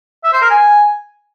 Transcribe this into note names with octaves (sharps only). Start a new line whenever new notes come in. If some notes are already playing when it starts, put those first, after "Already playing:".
E5
C5
A#4
G#5